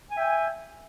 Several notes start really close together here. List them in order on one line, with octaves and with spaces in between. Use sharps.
G#5 G5 E5